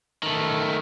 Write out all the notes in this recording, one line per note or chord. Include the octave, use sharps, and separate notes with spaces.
D#3 A3